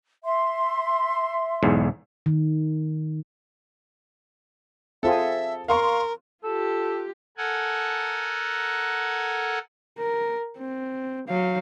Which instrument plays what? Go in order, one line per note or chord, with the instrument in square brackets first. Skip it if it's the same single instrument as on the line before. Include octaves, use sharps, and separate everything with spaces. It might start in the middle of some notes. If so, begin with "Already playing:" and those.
[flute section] E5 C6
[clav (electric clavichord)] B1 E2 G#2
[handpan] D#3
[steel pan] C4 F4 G#4 [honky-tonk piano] A4 [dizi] E5
[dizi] A#4 [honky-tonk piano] F5 C6 C#6
[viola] F4 G4 [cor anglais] A4
[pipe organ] A4 A#4 F#5 G#5
[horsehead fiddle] A#4
C4
F#3 F5